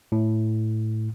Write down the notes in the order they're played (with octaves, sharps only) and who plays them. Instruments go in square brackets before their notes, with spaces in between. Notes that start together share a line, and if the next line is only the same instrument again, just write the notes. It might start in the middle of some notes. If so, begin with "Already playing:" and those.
[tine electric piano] A2